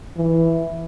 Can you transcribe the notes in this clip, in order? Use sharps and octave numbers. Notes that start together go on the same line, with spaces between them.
E3